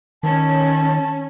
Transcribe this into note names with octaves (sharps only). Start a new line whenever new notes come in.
D#3 C#4 A5